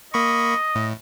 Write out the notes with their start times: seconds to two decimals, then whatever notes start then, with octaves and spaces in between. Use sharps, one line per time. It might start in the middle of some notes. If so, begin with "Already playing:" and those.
0.14 A#3 D#5 B5 C#6
0.75 A2